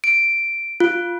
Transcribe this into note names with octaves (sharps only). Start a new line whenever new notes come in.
D7
F4